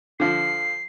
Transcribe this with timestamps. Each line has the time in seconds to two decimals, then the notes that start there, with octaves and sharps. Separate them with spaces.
0.20 D3 F3 C7